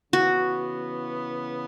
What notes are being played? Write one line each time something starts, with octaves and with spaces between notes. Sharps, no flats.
C#3 E3 B3 F#4